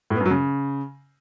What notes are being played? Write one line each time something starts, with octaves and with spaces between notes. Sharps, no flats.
A2
B3
F#2
F#3
C#3